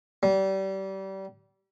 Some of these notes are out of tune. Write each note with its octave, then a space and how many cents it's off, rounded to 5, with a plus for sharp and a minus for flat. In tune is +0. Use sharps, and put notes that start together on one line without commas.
G3 -30